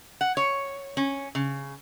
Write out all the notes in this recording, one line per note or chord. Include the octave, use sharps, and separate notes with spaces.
F#5
C#5
C#4
C#3